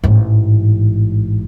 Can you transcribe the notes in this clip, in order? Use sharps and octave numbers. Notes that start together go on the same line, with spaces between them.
A1 G#2